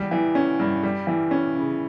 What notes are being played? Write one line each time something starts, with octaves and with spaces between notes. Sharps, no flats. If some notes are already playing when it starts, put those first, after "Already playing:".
Already playing: E2 G3
E3
C#4
G2
G3
E3
C#4
C#3